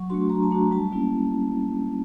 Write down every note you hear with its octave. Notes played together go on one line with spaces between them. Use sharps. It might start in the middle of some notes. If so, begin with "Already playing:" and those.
Already playing: F#3 C#6
A3 D4 F#4 C6
F#3 A#5
A5
A3 D4 F#4 A#5
G3 A5
A#3 C#4 E4